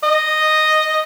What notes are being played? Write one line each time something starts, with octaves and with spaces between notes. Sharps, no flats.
D#5